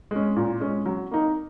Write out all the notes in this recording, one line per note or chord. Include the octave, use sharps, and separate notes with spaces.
G#3 C#4
A#2
G#3 C#4
F#3
A#3 D#4